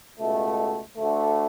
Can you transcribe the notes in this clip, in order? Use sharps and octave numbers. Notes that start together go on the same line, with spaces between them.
C#2 B2 A3
D2 D3 A3